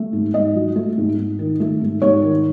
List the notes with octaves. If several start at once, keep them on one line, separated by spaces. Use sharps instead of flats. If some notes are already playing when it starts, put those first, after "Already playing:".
Already playing: A3
G#2
G#2 D#5
F#3
A3
G#2
G#2
D#3
A3
G#2
G#2 C#5
D#3